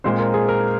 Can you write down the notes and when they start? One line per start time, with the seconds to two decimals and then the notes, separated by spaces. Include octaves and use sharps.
0.04 A#2 G#3 C4 C5
0.19 A#4
0.34 G#4
0.48 A#4